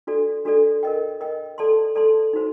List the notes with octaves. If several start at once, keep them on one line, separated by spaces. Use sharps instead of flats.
D4 F#4 A4 D5
D4 F#4 A4 D5
A#4 D#5 G5
A#4 D#5 G5
A4 D5 A5 C6
A4 D5 A5 C6
D#4 F#4 C5